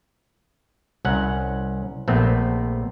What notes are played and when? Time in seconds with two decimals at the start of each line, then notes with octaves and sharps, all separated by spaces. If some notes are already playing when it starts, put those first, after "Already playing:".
1.05 C2 C#4 F#5
2.08 A#1 A3 B3 C4